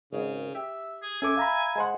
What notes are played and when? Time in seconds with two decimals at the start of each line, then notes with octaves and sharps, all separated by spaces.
0.13 G#1 C#3
0.55 G4 E5
1.03 G#4
1.22 C#4 A4 E5 G#5 D6
1.37 F5 A#5 B5
1.76 G#3 C5 F#5